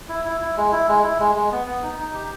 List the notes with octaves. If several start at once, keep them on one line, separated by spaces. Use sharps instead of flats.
E4
E4
E4
G#3
E4
G#3
E4
G#3
G#3
B3
B3
D#4
D#4
G4